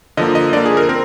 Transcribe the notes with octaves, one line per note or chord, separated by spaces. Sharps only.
D3 F3 A#3 D#5
D#5
D3 F3 A#3 D5
G#4
A#4
C4 A#4